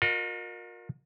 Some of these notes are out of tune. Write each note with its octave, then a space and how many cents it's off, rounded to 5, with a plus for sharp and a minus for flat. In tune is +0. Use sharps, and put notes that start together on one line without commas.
F4 +45 A#4 +0 D#5 -25